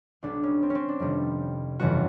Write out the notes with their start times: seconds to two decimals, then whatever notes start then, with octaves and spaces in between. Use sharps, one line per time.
0.23 B1 B2 G3 B3 D4
0.43 C#4
0.63 C4
0.70 C#4
0.75 C4
0.89 D4
1.00 F2 C3 D#3 G3 B3
1.79 G1 F2 C#3 E3 G3 F#4